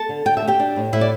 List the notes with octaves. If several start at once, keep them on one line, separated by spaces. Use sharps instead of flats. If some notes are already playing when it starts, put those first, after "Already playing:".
Already playing: A4 A5
D3
D3 G5
E5
A3
G4 G5
D4
A2
A2 E4 E5
D5